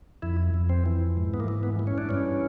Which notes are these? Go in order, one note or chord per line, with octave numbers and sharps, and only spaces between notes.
F2 E4
F2
C4
E3
G#2
B3
A#3
E3
B3
E3
C#4
D4
G2 C#4